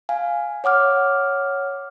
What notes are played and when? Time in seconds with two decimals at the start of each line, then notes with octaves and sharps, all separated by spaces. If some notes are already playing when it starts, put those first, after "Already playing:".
0.09 F5 G#5
0.64 C#5 F#5 D6 F6